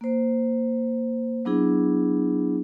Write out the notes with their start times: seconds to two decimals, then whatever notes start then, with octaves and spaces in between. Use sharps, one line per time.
0.01 A#3 C5
1.45 F#3 B3 D4 E4 G#4